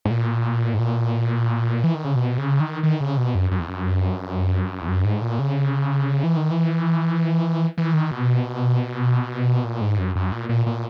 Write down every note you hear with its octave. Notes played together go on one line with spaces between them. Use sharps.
G#2
A#2
G#2
A#2
E3
D#3
C#3
B2
C#3
D#3
D#3
C#3
B2
F#2
F#2
E2
F#2
E2
F#2
G#2
A#2
C#3
E3
D#3
E3
E3
D#3
B2
A#2
G#2
F#2
F#2
A#2
A#2
A#2